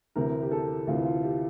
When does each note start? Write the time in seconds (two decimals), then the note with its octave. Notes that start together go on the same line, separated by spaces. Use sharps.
0.16 D2 C3 E3 A#4
0.42 G4
0.51 A4
0.87 D2 C3 E3 F4
0.97 E4
1.06 F4
1.23 G4